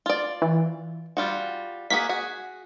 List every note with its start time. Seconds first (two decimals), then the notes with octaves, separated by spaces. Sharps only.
0.06 F4 D5
0.42 E3
1.17 G3 F4 F#4
1.90 A#3 F#4 G#4 B6
2.09 F#4 G#4